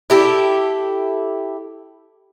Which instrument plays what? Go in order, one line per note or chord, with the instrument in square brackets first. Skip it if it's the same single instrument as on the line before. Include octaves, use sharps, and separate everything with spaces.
[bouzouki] E4 G4 A4